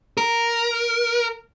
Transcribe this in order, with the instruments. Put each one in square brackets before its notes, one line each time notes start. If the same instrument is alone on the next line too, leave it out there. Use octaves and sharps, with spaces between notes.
[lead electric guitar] A#4